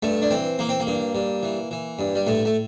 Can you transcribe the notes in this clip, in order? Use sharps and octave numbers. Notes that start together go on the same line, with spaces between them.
G2 A3
D4
E3 C4
E3 A#3
C4
A#3
G2
G2
E3
E3
G2
G3
A2 A3
A3